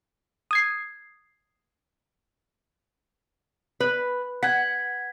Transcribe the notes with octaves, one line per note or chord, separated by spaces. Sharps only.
D#6 G#6 C7
B4
F#5 G#6 B6